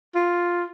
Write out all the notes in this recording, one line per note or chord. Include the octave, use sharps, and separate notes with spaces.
F4